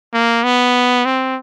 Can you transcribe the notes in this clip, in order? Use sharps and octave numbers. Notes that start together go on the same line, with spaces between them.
A#3
B3
C4